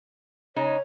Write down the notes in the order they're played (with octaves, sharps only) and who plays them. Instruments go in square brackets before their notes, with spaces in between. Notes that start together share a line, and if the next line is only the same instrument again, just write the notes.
[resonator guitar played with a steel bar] C#3 G#3 D#4 [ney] C#5